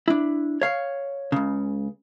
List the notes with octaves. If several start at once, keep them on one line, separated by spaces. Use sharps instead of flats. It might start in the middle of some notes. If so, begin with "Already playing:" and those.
D4 E4
C#5 F5
C#2 C#3